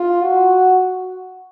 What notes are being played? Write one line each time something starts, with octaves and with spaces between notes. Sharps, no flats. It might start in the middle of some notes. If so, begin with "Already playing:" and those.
Already playing: F4
F#4